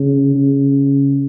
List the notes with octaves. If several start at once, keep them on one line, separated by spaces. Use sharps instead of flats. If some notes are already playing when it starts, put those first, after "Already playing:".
Already playing: C#3
C#3